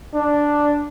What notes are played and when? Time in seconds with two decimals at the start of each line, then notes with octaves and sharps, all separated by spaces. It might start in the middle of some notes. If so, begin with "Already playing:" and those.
0.14 D4